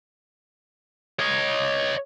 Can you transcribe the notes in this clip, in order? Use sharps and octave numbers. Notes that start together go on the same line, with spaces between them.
C#5 D#5